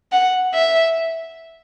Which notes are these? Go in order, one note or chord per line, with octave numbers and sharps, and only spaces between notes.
F#5
E5